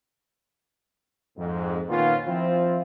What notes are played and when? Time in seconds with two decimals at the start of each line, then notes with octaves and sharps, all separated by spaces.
1.37 F2 G#2
1.89 A#2 D#3 A#3 B3 C#4 F4
2.27 F3 C4 E4 F4